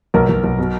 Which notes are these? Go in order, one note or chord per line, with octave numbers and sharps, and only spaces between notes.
B1 A#4
B1
B1
B2